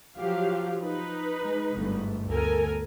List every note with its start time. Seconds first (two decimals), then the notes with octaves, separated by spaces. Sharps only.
0.18 F3 F#3 G4 F5
0.81 D#4 B4
1.44 G#3
1.74 G1 G#2 A3
2.28 D2 B3 A4 A#4 G#5